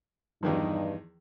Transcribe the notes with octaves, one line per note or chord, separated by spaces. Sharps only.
E2 G2 D#3 F3 D#4